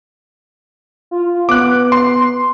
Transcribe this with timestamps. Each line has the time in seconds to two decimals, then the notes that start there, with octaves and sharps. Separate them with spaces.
1.11 F4
1.49 B3 D6 F#6
1.92 C6